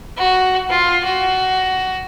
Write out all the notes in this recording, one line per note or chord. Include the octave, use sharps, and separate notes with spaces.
F#4
F4
F#4